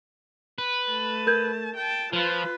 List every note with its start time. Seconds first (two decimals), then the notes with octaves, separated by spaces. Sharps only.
0.58 B4
0.89 A3 A5
1.27 A#4 G6 G#6
1.76 G5 A5
2.13 F3 F4 B4